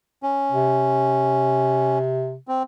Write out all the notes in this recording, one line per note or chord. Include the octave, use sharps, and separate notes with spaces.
C#4
C3
C4